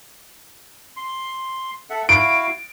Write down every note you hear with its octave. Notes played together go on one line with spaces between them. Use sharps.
C6
A4 E5 F#5
E4 F#4 F5 D7